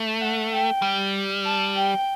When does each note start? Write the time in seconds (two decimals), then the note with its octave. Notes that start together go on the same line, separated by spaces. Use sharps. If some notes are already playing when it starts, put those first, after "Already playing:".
Already playing: A3
0.21 F#5
0.52 G5
0.82 G3
1.45 A5
1.75 G5